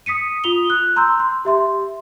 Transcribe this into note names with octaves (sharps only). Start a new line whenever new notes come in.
D#6 B6 C#7 D#7
F4 D#6 F7 G7
F#6
A#5 C6 E6 G6
C6
G4 E5 C6